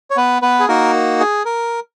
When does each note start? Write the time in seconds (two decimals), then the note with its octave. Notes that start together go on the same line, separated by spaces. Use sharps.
0.10 C#5
0.17 B3 B4
0.42 B3 B4
0.60 G#4
0.68 A#3 D#4 F#4 A#4
1.20 G#4
1.45 A#4